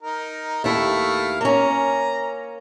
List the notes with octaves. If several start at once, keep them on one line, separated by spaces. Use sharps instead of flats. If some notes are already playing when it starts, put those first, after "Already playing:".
D#4 A#4
D#2 A3 E4 F5
A#3 C#4 A#5